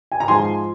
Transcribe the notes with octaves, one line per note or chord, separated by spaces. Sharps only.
G#5
A#5
G#2 F3 G#5 C6